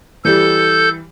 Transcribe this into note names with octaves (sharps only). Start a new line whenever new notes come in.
E3 G3 A4 G6